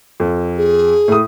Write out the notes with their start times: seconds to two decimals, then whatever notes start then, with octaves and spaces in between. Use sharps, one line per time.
0.20 F2
0.57 G#4
1.08 A2 D#6